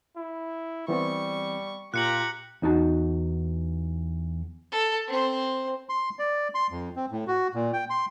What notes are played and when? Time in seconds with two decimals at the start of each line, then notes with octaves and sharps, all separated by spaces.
0.17 E4
0.88 E3 G3 B3 C4 C#6
1.94 A#2 F4 G4 A#5 F#6 C#7 F#7
2.62 E2 D#4 F#4 A5
4.72 A4
5.08 C4 C5
5.89 C6
6.19 D5
6.55 C6
6.71 F2
6.96 C4
7.11 A2
7.27 F#4
7.55 A#2
7.73 G5
7.90 C6